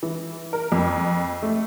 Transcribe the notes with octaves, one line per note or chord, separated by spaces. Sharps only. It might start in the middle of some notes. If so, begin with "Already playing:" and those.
E3
A#4
F2
A3